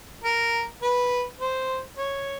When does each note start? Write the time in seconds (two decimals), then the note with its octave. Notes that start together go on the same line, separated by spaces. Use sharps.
0.24 A#4
0.82 B4
1.40 C5
1.98 C#5